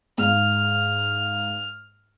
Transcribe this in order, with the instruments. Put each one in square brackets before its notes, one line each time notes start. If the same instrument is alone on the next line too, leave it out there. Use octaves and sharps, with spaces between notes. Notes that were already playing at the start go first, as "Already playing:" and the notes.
[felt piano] G#2 F5 [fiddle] F6